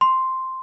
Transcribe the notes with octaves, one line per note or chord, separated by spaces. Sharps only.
C6